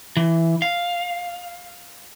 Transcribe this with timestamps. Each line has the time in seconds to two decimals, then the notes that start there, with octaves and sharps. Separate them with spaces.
0.17 E3
0.62 F5